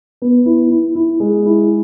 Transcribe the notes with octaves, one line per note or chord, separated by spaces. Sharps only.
B3
E4
E4
E4
G#3
E4